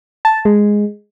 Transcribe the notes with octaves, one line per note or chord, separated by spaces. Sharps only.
A5
G#3